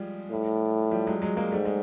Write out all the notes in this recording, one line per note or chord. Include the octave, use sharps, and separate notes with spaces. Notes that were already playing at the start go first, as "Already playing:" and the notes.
Already playing: F3 G3 G#3
A2
F3 G3
F#3 G#3
F#3 G#3
G#3 A#3
G#2 G3 A3
G#3